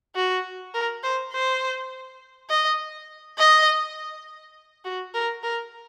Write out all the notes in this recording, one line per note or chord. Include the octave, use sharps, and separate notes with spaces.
F#4
A#4
C5
C5
D#5
D#5
F#4
A#4
A#4